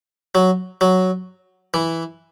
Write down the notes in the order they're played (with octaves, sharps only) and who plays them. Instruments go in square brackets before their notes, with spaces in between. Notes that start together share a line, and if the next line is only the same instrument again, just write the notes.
[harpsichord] F#3
F#3
E3